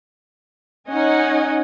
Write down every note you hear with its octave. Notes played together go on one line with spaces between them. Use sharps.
C#4 D#4 D#5 F#5 G#5